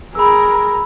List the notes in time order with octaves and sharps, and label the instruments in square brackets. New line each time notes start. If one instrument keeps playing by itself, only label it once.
[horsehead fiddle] G#4 A#4 [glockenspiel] B5 E6